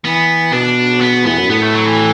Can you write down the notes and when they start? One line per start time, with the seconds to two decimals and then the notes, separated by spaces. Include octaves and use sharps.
0.05 E3 B3
0.52 B2 D4
1.01 B3
1.25 E2 B3
1.38 F#2
1.50 A2 B3
1.62 A3
1.74 F#3
1.86 E3